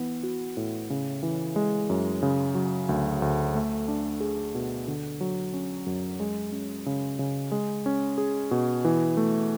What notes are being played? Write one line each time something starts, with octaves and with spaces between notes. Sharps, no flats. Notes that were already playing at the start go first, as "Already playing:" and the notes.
Already playing: E3 B3
F#4
A2
C#3
E3
G#3
F#2
C#3
F#3
D2
D2
A3
D4
G#4
B2
D3
F#3
C#4
F#2
G#3
C#4
C#3
C#3
G#3
C#4
G#4
B2
E3
A3